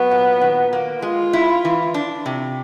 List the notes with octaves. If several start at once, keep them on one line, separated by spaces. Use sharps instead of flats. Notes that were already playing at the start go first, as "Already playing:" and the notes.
Already playing: F#3 B3
A#2
D#3
A#3
G#3 F4
E4
E3
D4
C3